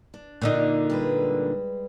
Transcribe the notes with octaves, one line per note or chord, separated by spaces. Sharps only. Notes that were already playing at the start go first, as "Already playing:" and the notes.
D4
A#2 D3 D#4
G3 G#3 B4